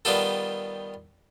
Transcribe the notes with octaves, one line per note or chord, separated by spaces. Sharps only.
D#3 G3 B3 F4 G4 A4